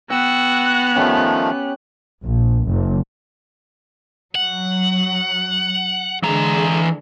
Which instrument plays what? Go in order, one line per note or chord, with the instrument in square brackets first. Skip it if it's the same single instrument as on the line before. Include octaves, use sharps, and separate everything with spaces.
[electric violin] B3 F#6 [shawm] F#4 [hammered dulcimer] G5 [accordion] E6
[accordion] D#3 F3 A3 [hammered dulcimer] C#4 G4 C#5
[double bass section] A#1
F#1
[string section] F#3 [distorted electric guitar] F#5
[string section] D3 G#3 [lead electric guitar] E3 A#5